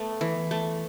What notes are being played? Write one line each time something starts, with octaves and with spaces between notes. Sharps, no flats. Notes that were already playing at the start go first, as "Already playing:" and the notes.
Already playing: A3 B3
E3
A3